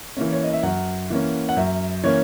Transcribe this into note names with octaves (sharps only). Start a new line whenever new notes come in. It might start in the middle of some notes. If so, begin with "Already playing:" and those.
E3 A#3 C#4
C#5
D#5
E5
F#2 F#5
E3 A#3 C#4
F#5
F#2 E5
E3 A#3 C#4 C#5